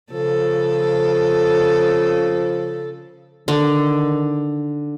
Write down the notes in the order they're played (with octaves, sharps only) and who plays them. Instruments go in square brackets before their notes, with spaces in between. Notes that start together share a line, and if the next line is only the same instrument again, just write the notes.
[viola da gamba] C#3 A4 [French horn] F3
[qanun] D3 [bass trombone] D#3